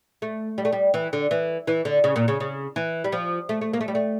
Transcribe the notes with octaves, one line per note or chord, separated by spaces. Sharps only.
A3
G3
A3
G3
E3
D3
E3
E3
D3
C#3
A#2
C#3
C#3
E3
G3
F3
A3
A3
A#3
A3
G3
A3